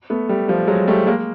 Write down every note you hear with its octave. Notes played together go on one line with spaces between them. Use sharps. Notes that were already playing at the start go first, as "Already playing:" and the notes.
A3 B3
G3 A3
F3 G3
F#3 G#3
G3 A3
G#3 A#3